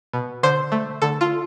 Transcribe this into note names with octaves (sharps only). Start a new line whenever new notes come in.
B2
D3 C5
A3
D3 A4
F4